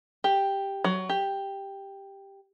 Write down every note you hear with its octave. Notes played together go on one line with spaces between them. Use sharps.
G4
F#3
G4